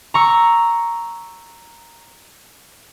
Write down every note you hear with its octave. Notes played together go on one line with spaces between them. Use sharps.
A#5 C#6 E6